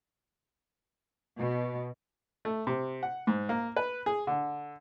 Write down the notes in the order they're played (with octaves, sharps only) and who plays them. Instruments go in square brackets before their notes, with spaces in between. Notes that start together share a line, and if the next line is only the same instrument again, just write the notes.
[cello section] B2
[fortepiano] A3
C3
F#5
G#2
A#3
B4
G#4
D3